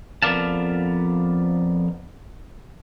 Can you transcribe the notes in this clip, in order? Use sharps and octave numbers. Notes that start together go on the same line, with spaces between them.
F2 B3 A#4 D5 F5 A5